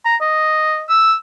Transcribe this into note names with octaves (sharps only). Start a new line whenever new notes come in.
A#5
D#5
E6